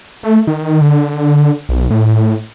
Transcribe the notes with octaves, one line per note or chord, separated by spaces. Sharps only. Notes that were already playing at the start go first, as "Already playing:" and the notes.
A3
D#3
D3
B1
A2